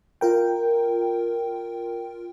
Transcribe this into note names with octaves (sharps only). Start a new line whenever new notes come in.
F4 A#4 G5